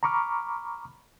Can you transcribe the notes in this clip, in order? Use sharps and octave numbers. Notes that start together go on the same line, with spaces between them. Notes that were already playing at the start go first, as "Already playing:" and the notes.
A#5 B5 C#6 D6 F6